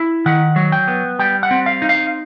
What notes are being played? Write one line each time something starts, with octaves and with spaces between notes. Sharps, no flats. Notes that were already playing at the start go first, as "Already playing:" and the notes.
Already playing: E4
D#3 F#5
F#3
G5
B3
G3 G5
F#5
C4
F5
D#4
F5